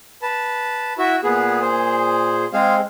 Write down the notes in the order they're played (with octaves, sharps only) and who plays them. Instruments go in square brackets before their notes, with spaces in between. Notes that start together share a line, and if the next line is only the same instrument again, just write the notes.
[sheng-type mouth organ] B4 A5
[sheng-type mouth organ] E4 E5 [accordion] F#4
[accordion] A#2 G#4 [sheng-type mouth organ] B3
[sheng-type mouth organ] C5
[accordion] G#3 C4 [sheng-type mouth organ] G#4 C5 F5